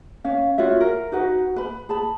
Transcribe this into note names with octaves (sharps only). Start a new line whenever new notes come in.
C#4 F5
F4 F#4 C#5 E5
A#4
D#4 F#4 B4 F#5
B4 B5
G#4 A5 B5